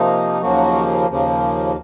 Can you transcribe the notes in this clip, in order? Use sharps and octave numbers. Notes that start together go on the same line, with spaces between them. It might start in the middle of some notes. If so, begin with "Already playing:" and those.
Already playing: C3 F3 A#3 D#4
D#2 C#3 F3 F#3 A#3 F#4
D#2 C#3 F3 A#3